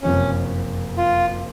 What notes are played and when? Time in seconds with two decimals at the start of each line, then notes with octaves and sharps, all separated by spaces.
0.02 F#1 F2 C3 C#4
0.97 F4